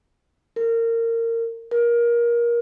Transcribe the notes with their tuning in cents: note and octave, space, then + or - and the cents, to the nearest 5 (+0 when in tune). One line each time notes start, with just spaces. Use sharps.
A#4 -25
A#4 +20